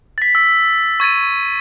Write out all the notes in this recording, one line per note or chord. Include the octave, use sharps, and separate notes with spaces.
A6 B6
E6
C#6 G#6 A6 D#7